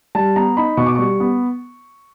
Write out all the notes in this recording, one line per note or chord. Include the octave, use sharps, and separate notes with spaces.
G3 A5
B3 A#5
D#4 B5
B2 C#6
D6
G3 C#6
B3